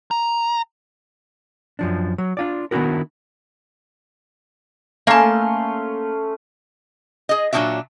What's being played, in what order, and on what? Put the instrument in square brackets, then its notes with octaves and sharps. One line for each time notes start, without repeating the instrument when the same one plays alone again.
[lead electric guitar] A#5
[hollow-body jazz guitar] F#2 F3 D4
F#3
D4 F4 D5
D#3 B3 D4 E4 F#4 A#4
[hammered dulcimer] A3 C#4 C6 [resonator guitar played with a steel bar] A#3 A5
[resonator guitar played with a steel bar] G#4 D#5
A#2 F#3 C4 D4 F#4 E5